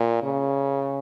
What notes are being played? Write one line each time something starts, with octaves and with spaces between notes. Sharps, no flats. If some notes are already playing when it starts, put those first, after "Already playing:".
Already playing: A#2
C#3